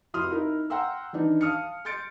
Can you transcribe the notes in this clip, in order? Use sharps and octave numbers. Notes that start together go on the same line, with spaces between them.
F1 E4 F#4 C6 D#6 F6
D#4 E4 A#4
F#5 G5 A#5 C6 E6
D#3 E3 D4 D#4
F5 A5 D#6 F6 C#7
C6 G6 A6 C#7 D7